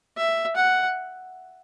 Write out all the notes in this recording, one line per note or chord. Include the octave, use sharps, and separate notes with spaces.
E5
F#5